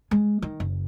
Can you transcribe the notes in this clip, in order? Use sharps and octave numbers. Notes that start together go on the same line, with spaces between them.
G#3
D#3
F#1